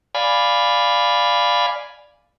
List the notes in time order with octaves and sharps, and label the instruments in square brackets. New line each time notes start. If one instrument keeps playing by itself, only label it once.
[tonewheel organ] D5 F5 G#5 B5